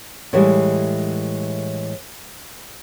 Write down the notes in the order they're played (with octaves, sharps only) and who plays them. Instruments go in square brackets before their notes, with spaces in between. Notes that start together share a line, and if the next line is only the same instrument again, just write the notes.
[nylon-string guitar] A2 D3 E3 G3 G#3